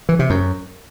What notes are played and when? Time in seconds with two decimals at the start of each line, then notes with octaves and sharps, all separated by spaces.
0.09 E3
0.19 C3
0.30 F#2